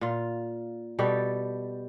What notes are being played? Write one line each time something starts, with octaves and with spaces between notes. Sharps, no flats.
A#2 F4
B2 G3 G4 A4